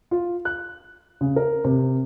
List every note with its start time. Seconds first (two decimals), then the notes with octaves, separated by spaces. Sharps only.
0.11 F4
0.45 F#6
1.21 C#3
1.36 A#4
1.65 C3